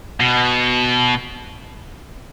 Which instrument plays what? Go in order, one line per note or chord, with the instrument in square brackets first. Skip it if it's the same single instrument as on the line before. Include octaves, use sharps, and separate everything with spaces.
[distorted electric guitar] B2